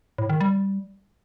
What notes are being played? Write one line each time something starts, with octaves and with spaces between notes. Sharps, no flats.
A2
D#3
G3